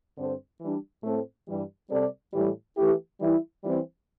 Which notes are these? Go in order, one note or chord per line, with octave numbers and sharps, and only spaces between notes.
G2 D3 C4 A4 C5
E3 G3 D4
A2 A3 C4 A4
G2 E3 G3
C3 G3 C4 A4 D5
A2 E3 G3
E3 A3 E4 G4
E3 G3 E4
E3 G3 C4 E4